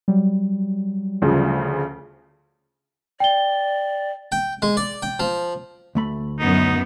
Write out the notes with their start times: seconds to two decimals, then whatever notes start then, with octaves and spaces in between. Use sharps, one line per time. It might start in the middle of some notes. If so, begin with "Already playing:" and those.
0.08 F#3 G3
1.22 D2 C#3 F3
3.20 D5 G5 G7
4.32 G5
4.62 G#3
4.77 D5
5.03 G5
5.20 F3
5.95 D2 A3 B5
6.40 F#2 B3 D#4